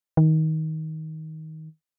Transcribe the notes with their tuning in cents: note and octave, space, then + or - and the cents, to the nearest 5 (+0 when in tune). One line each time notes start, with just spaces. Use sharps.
D#3 +20